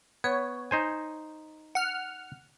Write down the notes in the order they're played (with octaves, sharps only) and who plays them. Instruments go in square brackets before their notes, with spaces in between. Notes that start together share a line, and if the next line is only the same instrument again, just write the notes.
[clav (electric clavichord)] B3 [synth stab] C#5
[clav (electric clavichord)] D#4 C5 G#5
[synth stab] F#5 F6